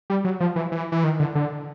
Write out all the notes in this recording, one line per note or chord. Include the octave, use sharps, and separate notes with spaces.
G3
F#3
F3
E3
E3
E3
D#3
D3
D3